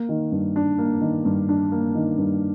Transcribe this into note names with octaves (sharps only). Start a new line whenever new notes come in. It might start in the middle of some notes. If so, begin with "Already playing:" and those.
Already playing: A#3
D#3
G2
D4
A#3
D#3
G2
D4
A#3
D#3
G2